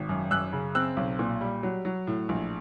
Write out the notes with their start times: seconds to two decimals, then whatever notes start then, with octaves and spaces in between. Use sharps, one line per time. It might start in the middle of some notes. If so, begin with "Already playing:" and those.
Already playing: G#1
0.09 F#2
0.31 F#2 E6 F#6
0.53 C#3
0.75 C4 E6 F#6
0.97 B1
1.19 A#2
1.41 G3
1.63 F#3
1.85 F#3
2.07 A2
2.29 A#1